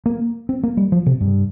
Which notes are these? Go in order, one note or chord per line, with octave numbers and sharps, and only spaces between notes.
A#3
C4
A#3
G3
F3
C3
G2